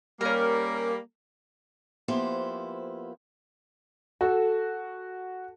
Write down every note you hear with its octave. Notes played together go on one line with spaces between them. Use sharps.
G3 A#3 C#4 A#4
F3 A#3 B3 E4 G4 C5
F#4 A4